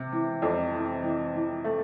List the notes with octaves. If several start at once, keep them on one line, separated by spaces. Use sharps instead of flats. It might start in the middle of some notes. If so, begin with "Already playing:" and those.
Already playing: C3
E3
F2
E3
E3
E3
A3